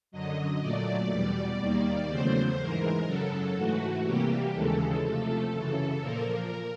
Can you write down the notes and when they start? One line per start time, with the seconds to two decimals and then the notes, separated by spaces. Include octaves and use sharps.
0.12 F#2 D3 F#3 D#5
0.61 A#2 F#3 A3 D5
1.10 E2 B2 G3
1.59 D#2 D#3 G3 A#3
2.08 E2 C#3 F#3 A3 C5
2.58 G#2 E3 G#3 A#4
3.06 F#2 C#3 F#3 A4
3.56 G#2 E3 A3 F#4
4.04 C3 E3 G3 A#3 G4
4.53 D#2 C#3 E3 G#3 A4
5.03 C3 F3 A3
5.52 F#2 C#3 E3
6.01 A#2 F3 A#3 A#4